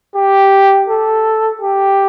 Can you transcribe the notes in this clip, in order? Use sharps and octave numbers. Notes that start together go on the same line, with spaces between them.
G4
A4
G4